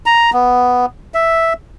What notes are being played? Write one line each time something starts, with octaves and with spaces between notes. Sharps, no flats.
A#5
B3
E5